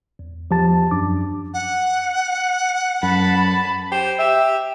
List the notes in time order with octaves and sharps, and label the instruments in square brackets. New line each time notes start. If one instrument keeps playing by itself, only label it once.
[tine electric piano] E2
E2 F3 G4 A5 A6
F#2 D4 D6
[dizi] F#5
[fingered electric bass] F#2 [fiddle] A5 B5
[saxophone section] G4 C5
G4 E5